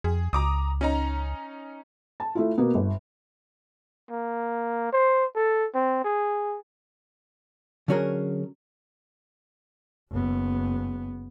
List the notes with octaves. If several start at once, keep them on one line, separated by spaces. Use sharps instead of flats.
F2 G#4
C#2 A#5 D6 D#6
C#4 D#4 A#5
A5
A3 E4 F4
B2 A#3 B3
G1
A#3
C5
A4
C4
G#4
D3 F#3 C#4 F#4 G#4 A#4
F#1 B3